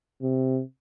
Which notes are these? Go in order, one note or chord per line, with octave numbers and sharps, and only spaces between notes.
C3